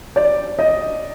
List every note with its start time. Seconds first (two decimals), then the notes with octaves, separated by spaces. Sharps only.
0.16 D5
0.59 D#5